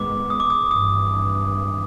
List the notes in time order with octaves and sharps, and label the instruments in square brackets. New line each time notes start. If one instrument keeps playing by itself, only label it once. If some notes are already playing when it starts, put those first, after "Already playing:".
Already playing: [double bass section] G#2 D#3 G#3 B3 [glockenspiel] D6
[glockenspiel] D#6
D6
D#6
[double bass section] G#1 G2 E3 [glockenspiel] D#6